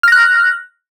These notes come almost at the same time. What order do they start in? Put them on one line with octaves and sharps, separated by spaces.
F6 A#6 F#6